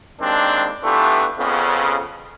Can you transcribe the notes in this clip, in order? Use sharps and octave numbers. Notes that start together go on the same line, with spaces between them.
D#2 D#3 G#3 C4 D4
E3 A3 B3 D4 F4 G4
F2 C#3 B3